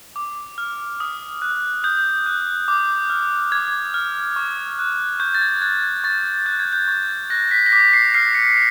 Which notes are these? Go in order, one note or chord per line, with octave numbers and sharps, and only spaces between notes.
D6
F6
D#6
F#6
D#6 G6
F#6
D6
F6
D6 G#6
F6
C#6
F#6
C#6 G6
A6
G#6
F#6 G#6
G#6
C#6 A6
F#6 G6
G#6
G6
C#6 G#6
A6
F#6 A#6
B6
A#6
D6 B6
C7
F6 C7
C#7